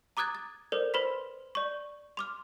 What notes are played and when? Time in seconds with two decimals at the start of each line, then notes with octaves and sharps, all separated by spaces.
0.17 A#5 D6 D#6 F#6 G#6 A6
0.35 A6
0.72 A4 A#4 C5 D5
0.94 B4 C5 B5 C6 B6
1.55 D5 C#6
2.17 C6 D6 F6